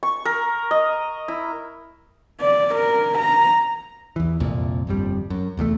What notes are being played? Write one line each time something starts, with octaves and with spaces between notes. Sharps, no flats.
C#6
A#4
D#5
E4
D5
A#4
A#5
E2 E3
C2 F2 A#2
G1 F2 G3
F#2
F1 E2 G#2 A3